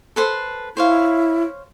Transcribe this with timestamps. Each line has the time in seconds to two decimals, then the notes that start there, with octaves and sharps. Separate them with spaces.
0.16 A4 B4 C5
0.77 E4 C5 C#5 F5